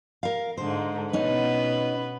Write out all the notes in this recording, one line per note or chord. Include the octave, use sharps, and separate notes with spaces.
A#4 F5
G#2 D3 C5
B2 B3 C#4 D#4 B4